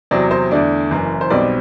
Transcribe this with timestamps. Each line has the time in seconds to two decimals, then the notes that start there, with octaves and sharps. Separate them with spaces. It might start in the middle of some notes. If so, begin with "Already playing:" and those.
0.11 E2 C3 F#3 C4 D5
0.31 C5
0.51 E2 D3 A3 D4 D5
0.91 F#1 F#2 E3
1.21 C5
1.30 B1 B2 G3 C4 D5